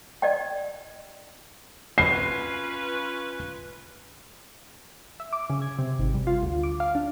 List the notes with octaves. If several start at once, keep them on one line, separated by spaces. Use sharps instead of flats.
D5 D#5 G5
C#4 F4 B4 C7
E5
D6
C#3
G#6
C3
G#1
G3
F4
D2
D6
F5
D4